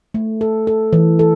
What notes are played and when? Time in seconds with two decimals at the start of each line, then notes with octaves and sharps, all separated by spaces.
0.14 A3
0.41 A4
0.67 A4
0.93 E3
1.19 A4